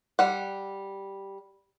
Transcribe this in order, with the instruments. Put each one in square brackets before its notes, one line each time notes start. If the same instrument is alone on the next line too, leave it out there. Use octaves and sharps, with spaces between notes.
[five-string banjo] G3 F#5